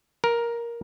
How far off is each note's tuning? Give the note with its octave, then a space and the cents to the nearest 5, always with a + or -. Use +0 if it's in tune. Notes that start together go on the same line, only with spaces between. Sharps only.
A#4 +10